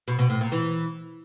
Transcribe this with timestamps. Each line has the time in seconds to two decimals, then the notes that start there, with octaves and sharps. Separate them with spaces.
0.08 B2
0.19 B2
0.30 A2
0.41 A#2
0.52 E3